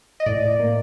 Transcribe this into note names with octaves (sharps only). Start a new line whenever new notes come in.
D#5
A2 D5
A#3